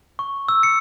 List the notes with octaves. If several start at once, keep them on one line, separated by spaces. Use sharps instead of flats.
C#6
E6
C#7